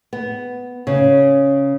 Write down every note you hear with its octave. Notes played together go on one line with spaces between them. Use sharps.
B3
C#3